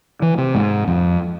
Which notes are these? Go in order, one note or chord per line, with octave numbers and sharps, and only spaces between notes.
E3
C3
G#2
F2